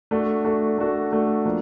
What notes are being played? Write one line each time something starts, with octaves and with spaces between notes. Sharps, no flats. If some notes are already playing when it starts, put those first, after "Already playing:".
A3 D4 F#4 A4
A3 D4 F#4 A4
A3 D4 F#4 A4
A3 D4 F#4 A4
F3 A#3 D4